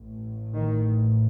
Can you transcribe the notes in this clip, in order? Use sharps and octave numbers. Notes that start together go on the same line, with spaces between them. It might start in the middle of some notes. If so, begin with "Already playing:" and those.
Already playing: A1 A2
D#3